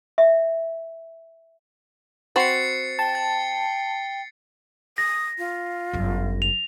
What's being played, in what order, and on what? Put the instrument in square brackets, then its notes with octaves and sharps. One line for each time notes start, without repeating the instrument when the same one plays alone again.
[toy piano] E5
[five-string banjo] C4 F#4 B5 [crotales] A6 C7 C#7
[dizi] G5 [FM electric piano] A5
[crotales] A6
[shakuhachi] D#6 [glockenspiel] A#6
[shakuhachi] F4
[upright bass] G1 F#2
[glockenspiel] F7